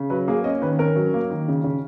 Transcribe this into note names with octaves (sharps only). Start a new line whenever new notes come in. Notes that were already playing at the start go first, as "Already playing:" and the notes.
Already playing: C#3
F#3 B4
A#3 G#4
C#4 D#5
D#3 B4
C#4 A#4
F#3
A#3
D#3
C#3
C#3